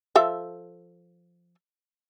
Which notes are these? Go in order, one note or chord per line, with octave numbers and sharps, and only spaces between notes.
F3 A4 E5